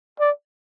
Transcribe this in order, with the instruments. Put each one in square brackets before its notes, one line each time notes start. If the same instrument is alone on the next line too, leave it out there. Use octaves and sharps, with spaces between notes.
[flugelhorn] D5